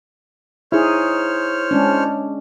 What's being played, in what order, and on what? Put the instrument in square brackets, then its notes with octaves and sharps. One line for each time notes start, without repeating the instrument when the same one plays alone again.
[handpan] D#4 G#4 [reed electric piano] E4 [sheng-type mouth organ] C5 C#5 F6
[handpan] G#3 C#4 D4